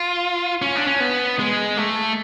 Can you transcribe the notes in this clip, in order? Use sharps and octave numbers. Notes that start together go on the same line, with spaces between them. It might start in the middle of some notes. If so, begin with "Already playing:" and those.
Already playing: F4
C#4
D4
C#4
B3
G#3
A3